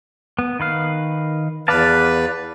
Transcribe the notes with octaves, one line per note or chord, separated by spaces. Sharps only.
B3
D#3 B4 F5
E2 B4 D5 F5 A5